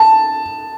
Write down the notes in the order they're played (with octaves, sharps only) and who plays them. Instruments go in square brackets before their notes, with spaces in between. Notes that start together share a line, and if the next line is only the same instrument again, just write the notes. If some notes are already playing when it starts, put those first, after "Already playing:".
Already playing: [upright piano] A5